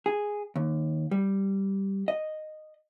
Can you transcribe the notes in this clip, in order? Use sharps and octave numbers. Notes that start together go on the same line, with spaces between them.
G#4
D#2
G3
D#5